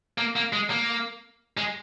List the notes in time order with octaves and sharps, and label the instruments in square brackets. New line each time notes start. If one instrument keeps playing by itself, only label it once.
[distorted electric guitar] A#3
A#3
G#3
A#3
G#3